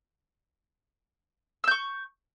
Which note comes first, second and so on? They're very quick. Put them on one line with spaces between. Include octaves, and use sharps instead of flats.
E6 G6 C#6